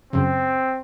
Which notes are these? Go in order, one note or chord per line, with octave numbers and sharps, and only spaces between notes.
F#2 C#3 C4